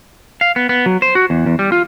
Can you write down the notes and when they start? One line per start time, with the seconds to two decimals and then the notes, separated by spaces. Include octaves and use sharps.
0.41 F5
0.56 B3
0.69 B3
0.86 F#3
1.02 C5
1.15 F#4
1.30 E2
1.46 E2
1.59 G3
1.72 F4